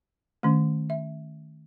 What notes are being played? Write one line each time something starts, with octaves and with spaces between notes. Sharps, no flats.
D#3 A3 C#4
E5